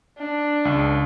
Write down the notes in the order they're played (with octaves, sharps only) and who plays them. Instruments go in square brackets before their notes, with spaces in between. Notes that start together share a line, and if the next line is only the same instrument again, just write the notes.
[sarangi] D4
[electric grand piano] C#2